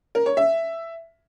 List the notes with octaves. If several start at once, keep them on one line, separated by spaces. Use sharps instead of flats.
A#4
C#5
E5